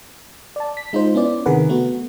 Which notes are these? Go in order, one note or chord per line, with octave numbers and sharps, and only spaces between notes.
D5 A5
B6
G#3 D#4 F4 C5
B3 C#4 E4 D5
C3 D#3 G#4 A#4 B4 F#5
A3 B3 F#4